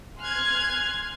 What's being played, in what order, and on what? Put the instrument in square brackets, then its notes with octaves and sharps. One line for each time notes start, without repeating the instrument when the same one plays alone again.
[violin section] G#5 C6 F6 F#6 G#6